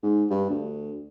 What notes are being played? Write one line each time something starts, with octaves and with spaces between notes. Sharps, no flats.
G#2
G2
D2